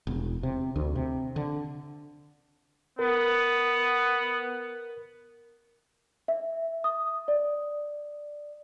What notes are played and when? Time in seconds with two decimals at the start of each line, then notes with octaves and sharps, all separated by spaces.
0.07 E1
0.43 C3
0.76 D2
0.96 C3
1.36 D3
2.99 B3 A#4
6.28 E5
6.84 D#6
7.28 D5